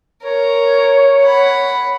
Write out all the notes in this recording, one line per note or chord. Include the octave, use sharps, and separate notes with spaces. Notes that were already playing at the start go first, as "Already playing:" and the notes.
A#4 C#5
F#5 B5